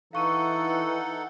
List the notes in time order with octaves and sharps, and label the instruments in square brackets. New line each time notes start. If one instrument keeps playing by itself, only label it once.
[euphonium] E3 [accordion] D#4 A4 F#5 [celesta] F5 C#6 D#7